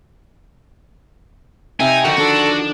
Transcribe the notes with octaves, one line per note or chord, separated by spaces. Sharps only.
C3 D#4 E5 G5 G#5
D3 D#3 F3 F#4
D4 A4